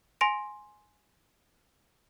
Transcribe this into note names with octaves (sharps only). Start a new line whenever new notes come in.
G#5 C6 A#6 D7